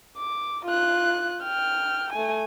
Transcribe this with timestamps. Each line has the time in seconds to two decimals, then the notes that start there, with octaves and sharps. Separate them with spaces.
0.17 D6
0.65 F4 F#6
1.43 G5 F6
2.13 A3 G#5